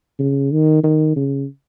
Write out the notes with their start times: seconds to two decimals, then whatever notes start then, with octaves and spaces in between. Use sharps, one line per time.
0.19 C#3
0.51 D#3
0.83 D#3
1.16 C#3